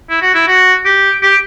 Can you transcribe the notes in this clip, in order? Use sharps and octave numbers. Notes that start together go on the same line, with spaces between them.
E4
F#4
E4
F#4
G4
G4